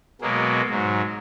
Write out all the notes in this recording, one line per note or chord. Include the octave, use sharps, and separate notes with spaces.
B2 F#3 G#3 A#3
G#2 F#3